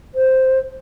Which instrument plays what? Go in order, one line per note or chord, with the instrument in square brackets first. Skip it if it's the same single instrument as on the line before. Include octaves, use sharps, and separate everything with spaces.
[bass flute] C5